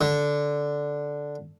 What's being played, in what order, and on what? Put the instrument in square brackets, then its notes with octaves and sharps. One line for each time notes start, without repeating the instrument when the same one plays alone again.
[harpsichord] D3